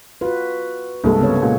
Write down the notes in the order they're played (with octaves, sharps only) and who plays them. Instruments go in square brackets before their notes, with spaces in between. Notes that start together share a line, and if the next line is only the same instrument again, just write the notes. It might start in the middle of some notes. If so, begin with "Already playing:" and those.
[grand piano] F4 [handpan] F#4 B4
[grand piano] C2 G2 G#3 [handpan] A#3 A4
[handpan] C#3 B3 C#5
[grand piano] A#2 G#3